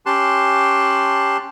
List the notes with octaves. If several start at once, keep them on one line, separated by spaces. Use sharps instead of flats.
C#4 G4 A5 C6 F#6